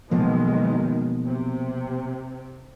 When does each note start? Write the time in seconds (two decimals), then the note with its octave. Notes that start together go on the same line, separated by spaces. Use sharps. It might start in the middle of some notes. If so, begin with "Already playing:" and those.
0.11 B1 B2 D#3 F3 G#3 A#3
1.26 C3